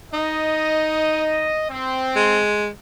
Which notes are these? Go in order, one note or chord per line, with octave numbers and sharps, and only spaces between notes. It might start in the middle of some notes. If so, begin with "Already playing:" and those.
D#4 D#5
C4
G#3